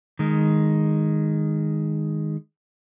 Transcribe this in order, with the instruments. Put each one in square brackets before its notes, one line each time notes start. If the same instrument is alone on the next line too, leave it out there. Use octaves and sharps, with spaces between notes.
[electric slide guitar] D#3 G#3